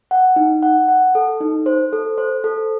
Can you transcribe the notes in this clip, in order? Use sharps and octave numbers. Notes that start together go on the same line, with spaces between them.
F#5
D#4
F#5
F#5
A4
D#4
C5
A4
C5
A4